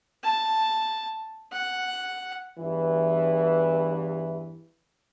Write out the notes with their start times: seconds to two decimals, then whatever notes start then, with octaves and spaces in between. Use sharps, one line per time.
0.24 A5
1.52 F#5
2.59 E2 G2 E3